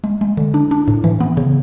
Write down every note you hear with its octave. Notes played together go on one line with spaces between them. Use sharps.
G#3
G#3
D3
D4
D4
A2
E3
B3
C#3